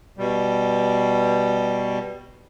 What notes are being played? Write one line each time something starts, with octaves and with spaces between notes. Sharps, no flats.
B2 G3